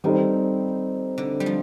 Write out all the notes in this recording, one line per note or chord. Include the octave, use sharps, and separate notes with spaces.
D#3 G3 C4 D#4 A4 C5
D3
G3
F3